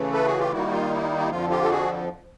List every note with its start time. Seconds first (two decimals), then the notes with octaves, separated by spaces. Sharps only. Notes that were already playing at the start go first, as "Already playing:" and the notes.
Already playing: C#3 E3 A3
0.13 A4 B4
0.26 F#4 G#4
0.38 F4 G4
0.51 D#3 G3 A#3 D#4 E4 F#4
0.71 F4
0.91 E4
1.18 E4
1.31 F2 D3 F3 F4
1.50 F4 G4
1.63 A4
1.70 F#4 G#4